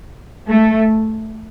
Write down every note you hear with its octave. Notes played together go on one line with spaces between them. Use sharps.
A3